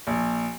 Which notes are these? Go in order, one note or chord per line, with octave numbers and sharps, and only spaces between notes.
A#1